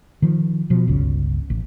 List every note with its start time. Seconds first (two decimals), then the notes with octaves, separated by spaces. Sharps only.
0.22 D#3 F3
0.70 B2 F3
0.87 G1 C#2 C#3
1.50 A1